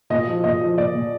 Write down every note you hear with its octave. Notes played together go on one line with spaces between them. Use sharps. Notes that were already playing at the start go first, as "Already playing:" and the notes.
A#2 D#5
F3
A#2 D#5
F3
A#2 D5
A#2